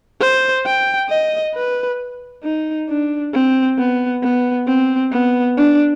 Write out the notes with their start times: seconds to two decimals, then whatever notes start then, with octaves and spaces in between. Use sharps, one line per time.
0.21 C5
0.65 G5
1.09 D#5
1.55 B4
2.43 D#4
2.89 D4
3.33 C4
3.78 B3
4.23 B3
4.67 C4
5.12 B3
5.57 D4